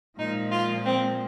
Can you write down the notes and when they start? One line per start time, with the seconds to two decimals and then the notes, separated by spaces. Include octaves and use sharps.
0.19 A#2 F3 G#3 D#4
0.52 F4
0.85 C4